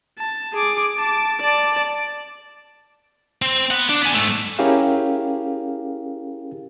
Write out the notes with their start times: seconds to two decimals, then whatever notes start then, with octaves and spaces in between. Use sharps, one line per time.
0.18 A5
0.53 G#4 D6
0.98 A5 D6
1.41 D5 A5
3.42 C4
3.71 B4 F#5
3.89 D4
4.01 B3 G#5
4.14 G#2 A3
4.59 C#4 E4 G4 G#4 A#4 F5